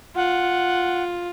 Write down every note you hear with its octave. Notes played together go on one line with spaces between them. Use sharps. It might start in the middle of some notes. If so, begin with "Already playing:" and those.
F4 F#5